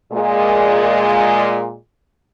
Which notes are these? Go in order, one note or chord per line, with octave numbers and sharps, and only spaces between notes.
A#2 G#3